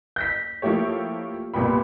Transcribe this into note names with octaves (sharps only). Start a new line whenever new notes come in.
G6 A#6 B6
F3 A3 A#3 E4 G4 C#5
C2 A#2 B3 G5 B5